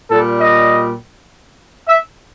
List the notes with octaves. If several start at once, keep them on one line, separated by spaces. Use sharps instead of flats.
A#2 G3 A4
D#5
E5